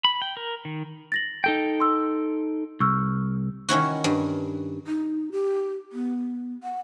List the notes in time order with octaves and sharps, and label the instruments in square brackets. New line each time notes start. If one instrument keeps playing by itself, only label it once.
[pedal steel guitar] B5
G5
A#4
D#3
[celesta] A6 A#6 F#7
[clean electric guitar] D#4 A4 G5
[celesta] C6 E6
[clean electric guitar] C2 [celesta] C#6 E6 F6
[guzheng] D#3 C#4 E4 F#4
G2
[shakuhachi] D#4
G4
B3
F#5